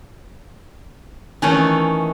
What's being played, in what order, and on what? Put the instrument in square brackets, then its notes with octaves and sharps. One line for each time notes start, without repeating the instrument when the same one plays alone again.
[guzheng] D#3 E3 A3 C#4